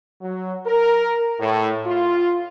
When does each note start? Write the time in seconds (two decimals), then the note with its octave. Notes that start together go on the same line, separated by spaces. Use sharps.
0.21 F#3
0.66 A#4
1.39 A2
1.85 F4